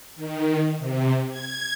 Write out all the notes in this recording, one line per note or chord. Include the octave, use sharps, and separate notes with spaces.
D#3
C3
G#6